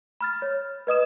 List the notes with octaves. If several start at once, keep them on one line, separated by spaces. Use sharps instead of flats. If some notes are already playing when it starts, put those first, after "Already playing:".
B5 F6 A6
C#5
B4 D#5 D#6 E7